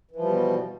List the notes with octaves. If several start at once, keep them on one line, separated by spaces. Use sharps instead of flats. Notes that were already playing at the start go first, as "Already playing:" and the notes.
B2 E3 F3 G3